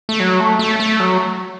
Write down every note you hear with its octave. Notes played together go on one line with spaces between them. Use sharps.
A3
F#3
A3
A3
A3
F#3